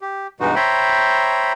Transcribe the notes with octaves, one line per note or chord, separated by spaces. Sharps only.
G4
G2 B2 E3 G#3 D#4 F#4
C5 C#5 E5 G5 A#5 B5